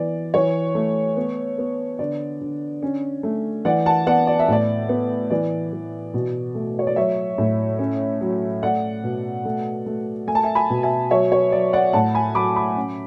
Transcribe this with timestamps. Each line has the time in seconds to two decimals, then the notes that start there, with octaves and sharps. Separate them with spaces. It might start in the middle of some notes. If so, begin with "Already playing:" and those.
Already playing: E3 B3 D5
0.34 E3 C#5
0.75 A3
1.17 B3
1.58 B3
1.99 D3 D5
2.41 D3
2.82 C#4
3.23 A3
3.65 E3 D5 F#5
3.86 F#5 A5
4.06 B3 D5 F#5
4.27 D5
4.39 E5
4.48 A2 D5
4.89 B3
5.30 E3 D5
5.73 E3
6.14 B2
6.55 A3
6.79 C#5
6.87 D5
6.96 F#3 C#5 E5
7.38 A2
7.79 C#4
8.21 F#3
8.63 A3 D5 F#5
9.04 B2
9.45 A3
9.86 A3
10.27 A3 G#5
10.35 A5
10.43 E5 G#5
10.55 G#5 B5
10.70 B2
10.83 E5 G#5
11.10 F#3 C#5 E5
11.32 C#5
11.52 F#3 D5
11.73 D5 F#5
11.93 A2 F#5 A5
12.14 G#5 B5
12.35 F#3 B5 D6
12.56 B5 D6
12.76 C#4